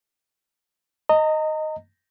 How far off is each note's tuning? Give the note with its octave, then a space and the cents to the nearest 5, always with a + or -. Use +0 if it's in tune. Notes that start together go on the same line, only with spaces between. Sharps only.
D#5 +0 A#5 -35